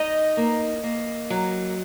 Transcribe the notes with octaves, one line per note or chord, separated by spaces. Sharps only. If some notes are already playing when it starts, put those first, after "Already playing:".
Already playing: D#4 D#5
A#3
A#3
F#3